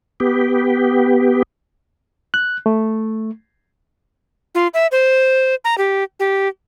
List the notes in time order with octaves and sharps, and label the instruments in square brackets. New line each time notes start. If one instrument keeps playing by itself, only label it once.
[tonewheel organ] B3 G4
[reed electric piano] F#6
A3
[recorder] F4
E5
C5
A#5
G4
G4